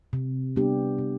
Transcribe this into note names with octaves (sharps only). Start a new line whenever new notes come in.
C3
G3 B3 D4 G4
C3